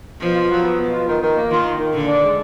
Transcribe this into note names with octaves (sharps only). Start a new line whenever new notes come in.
B2 F3
F4
F#3
B3
B2
F4
D#3
D#3
A#3
D#3 F4
D#3
D#3
A#2 D3
D4
G#3